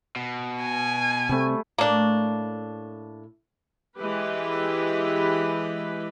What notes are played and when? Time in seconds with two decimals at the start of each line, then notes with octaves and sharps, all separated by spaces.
0.16 B2
0.62 G#5
1.29 C3 G3 A3 C4
1.78 A2 A3 A#3 D4
3.98 E3 G#3 G4 B4